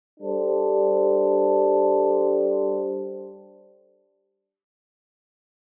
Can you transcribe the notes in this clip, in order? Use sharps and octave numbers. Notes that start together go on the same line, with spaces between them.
G3 D4 A4 C5